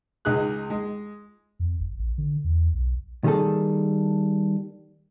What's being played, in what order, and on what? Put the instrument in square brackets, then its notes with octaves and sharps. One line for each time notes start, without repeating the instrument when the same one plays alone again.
[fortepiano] C#2 D#4 G#4 F#6
G#3
[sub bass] F2
G1
A1
D3
E2
B1
[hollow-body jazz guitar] D#3 G3 A#3 G#4 A4